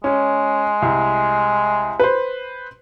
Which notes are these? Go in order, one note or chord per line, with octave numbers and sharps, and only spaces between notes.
G#3 C#4
C2
B4 C5